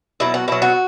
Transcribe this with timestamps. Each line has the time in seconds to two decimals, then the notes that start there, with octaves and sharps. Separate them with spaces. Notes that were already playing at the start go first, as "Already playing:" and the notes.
0.20 B2 F#3 E4
0.34 F#4
0.48 B2 F#3 E4
0.62 F#4